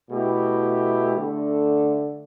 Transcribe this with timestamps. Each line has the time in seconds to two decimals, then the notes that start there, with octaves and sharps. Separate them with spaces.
0.09 B2 A3 E4 G4
1.15 D3 A3 D4 A4